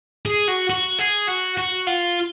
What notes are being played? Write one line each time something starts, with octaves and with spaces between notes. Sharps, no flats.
G#4
F#4
F#4
G#4
F#4
F#4
F4